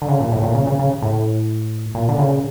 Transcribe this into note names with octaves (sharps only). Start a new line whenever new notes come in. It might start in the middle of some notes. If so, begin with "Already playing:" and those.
D3
C#3
A#2
A2
A#2
C#3
C#3
C#3
A2
A#2
D3
C#3